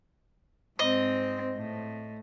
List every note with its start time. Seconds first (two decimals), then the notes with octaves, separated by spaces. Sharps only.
0.79 G#2 C4 D#5
1.56 A2